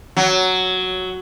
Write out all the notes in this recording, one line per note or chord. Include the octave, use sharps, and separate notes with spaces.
F#3